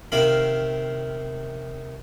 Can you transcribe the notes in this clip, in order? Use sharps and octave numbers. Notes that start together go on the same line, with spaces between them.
C3 D#3 A#4 F5 B5